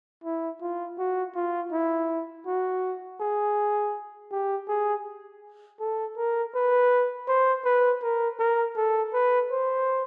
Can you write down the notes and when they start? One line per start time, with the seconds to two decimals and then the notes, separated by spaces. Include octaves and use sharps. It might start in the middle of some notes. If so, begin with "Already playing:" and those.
0.24 E4
0.61 F4
0.98 F#4
1.36 F4
1.72 E4
2.46 F#4
3.21 G#4
4.32 G4
4.68 G#4
5.80 A4
6.17 A#4
6.55 B4
7.28 C5
7.65 B4
8.03 A#4
8.39 A#4
8.77 A4
9.14 B4
9.51 C5